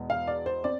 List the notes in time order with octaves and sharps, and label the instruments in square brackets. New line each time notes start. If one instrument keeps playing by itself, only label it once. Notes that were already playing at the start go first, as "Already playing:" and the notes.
Already playing: [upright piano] E2 B2 G#3 B3
F5
D5
C5
C4 D5